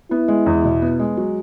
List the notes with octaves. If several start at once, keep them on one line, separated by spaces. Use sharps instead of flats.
B3 E4
G#3
E2
B2
B3
G#3
F#3